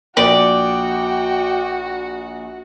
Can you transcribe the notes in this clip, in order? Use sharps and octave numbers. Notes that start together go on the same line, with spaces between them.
A#1 F#4 D5 G5